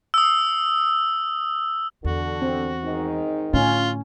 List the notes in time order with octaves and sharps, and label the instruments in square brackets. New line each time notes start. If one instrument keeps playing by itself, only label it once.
[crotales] D#6 E6
[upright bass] E2 [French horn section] D3 [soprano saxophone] F#4
[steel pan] C4
[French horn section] G#2 D#3 D#4
[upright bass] A2 D3 [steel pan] C#4 [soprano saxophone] F4